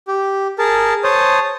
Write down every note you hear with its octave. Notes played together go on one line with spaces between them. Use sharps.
G4
G#4 A#4 A5
C5 C#5 A5 D#6